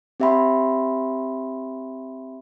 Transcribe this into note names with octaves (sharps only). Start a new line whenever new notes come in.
C4 G4 E5 G5 B5 C6